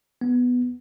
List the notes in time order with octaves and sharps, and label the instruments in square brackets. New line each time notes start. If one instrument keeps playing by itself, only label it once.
[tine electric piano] B3